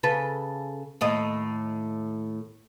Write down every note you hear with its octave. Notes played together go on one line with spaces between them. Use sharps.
C#3 A4 B4
D#2 A2 D#5